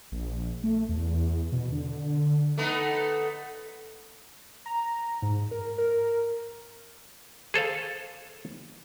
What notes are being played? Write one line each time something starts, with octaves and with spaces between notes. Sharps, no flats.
A#1
A3
E2
B2
D3
A3 B3 D#4
A#5
G#2
A#4
A#4
G#4 A4 C5 F5